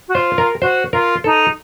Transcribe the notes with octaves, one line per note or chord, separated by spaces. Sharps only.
F#4
F4 C5
A#4
F#4 C5
F4 A#4
D#4 A4